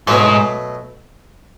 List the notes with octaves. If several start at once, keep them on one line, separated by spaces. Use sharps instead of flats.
G#2 B2 F#3 A3